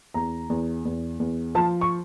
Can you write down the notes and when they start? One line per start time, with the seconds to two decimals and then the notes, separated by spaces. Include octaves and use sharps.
0.14 E2 A#5
0.50 E2
0.85 E2
1.20 E2
1.55 F3 A5
1.81 C#6